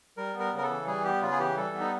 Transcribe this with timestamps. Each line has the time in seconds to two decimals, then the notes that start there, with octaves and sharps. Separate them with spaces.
0.17 G3 A#4
0.34 B3
0.40 A#4
0.52 C#3
0.57 A#4
0.63 A4
0.70 E3
0.86 G3 G#4
1.04 B3 G4
1.21 C#3 F4
1.31 G#4
1.39 E3 G4
1.57 G3 A4
1.74 B3
1.80 D#4